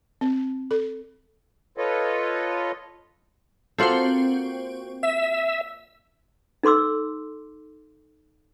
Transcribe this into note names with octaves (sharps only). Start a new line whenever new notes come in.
C4
A4
F4 A4 B4 C#5 D#5
A#3 C4 F4 F#4 A4 C5
E5 E6
D#4 A4 C6 D6 E6